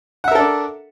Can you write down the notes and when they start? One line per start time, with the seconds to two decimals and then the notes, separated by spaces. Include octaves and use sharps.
0.24 F#5
0.28 E5
0.31 A#4
0.35 A4
0.39 D4